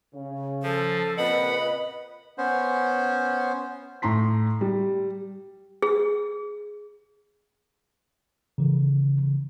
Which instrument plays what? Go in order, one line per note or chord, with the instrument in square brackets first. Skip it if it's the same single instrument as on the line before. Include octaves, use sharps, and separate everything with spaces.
[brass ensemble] C#3
[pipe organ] F3 [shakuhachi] A4
[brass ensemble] A#2 C#3 C4 [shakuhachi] B4 [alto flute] D#5 [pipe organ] F#5 B5
[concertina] B3 C#4 C5
[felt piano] A2 A#5 C6 B6
G3
[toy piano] G#4
[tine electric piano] C#3 E3